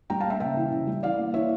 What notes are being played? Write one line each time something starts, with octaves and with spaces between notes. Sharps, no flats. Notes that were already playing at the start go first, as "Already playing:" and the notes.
G3 G5 A#5
F5 A5
A#3 E5 G5
C#3 E5 G5
E3
C#3
G3
E3 D5 F5
A#3
E3 C#5 E5